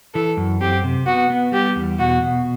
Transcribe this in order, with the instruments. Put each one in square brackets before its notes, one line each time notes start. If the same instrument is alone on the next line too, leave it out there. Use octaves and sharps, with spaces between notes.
[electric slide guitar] E3 [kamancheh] A4
[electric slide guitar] F#2
[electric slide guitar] C4 [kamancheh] G4
[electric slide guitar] C3
[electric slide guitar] B3 [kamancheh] F#4
[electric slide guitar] B3
[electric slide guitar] G3 [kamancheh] G4
[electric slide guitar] E2
[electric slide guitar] B2 [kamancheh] F#4
[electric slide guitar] B2